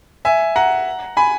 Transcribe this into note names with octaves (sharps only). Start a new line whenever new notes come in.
E5 G#5
F#5 A#5
G#5 B5